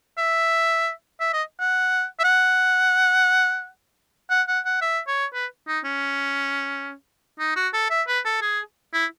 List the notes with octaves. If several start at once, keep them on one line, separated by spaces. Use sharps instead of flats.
E5
E5
D#5
F#5
E5
F#5
F#5
F#5
F#5
E5
C#5
B4
D#4
C#4
D#4
F#4
A4
E5
B4
A4
G#4
E4